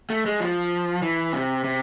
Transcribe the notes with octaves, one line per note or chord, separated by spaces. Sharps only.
A3
G#3
F3
E3
C3
C3